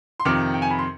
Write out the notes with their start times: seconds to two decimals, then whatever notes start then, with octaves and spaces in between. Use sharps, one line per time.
0.20 C6
0.25 F2 C3 D#3 D6
0.54 G5
0.62 G#5
0.70 B5
0.79 C6